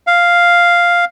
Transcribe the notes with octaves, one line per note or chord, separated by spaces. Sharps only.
F5